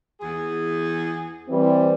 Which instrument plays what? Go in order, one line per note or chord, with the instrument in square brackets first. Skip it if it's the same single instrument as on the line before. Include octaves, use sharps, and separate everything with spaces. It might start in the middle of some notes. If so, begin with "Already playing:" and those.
[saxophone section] E2 G#4
[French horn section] E3 G3 C4